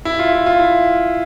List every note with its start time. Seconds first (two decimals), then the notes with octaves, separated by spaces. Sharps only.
0.05 E4
0.19 F4
0.33 E4
0.46 F4
0.59 E4